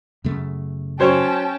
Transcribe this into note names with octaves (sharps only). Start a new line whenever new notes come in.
F#2 C#3 A3
F#3 C#4 C5 C#5 G5 A5